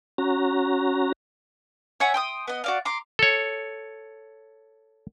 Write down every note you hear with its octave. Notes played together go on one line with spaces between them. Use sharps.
C#4 F#4 A#5
C#5 E5 F#5 G#5
G5 C6 D#6
B3 D#5
F#4 D5 F5
A#5 C6 D6
A4 C#5